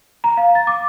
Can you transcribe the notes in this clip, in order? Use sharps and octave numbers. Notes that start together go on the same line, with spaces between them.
A#5
F5
A6
D6